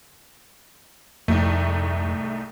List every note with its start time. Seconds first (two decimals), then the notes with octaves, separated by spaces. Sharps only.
1.28 C2 F2 G#2 A3